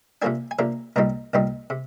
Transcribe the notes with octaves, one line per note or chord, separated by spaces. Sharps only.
C3 F3 A#3 D4 G#5
G#5
C3 F3 A#3 D4 A#5
C2 A#2 G3 C4 D#4 A#5
C2 A#2 G3 C4 D#4
C3